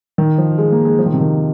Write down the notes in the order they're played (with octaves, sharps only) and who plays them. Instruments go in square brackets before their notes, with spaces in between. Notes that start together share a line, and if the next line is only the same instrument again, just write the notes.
[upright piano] D#3
F3
G#3
A#3
G#3
F3
D#3
C3
D#3